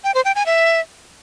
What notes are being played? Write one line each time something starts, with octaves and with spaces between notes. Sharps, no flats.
G5
C5
G5
G#5
E5